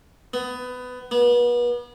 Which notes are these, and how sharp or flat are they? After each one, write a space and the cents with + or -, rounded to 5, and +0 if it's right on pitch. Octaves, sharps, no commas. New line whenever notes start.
B3 +20
B3 -35